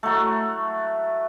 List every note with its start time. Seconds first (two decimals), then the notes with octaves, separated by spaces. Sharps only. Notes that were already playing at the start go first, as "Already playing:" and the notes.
0.03 F#3 A3